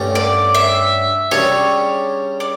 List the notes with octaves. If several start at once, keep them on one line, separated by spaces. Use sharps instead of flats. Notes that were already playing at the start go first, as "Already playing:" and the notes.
Already playing: G2 D3 A3 C#4 G4
D5
E5
C#3 G3 D4 G4 C#5
D5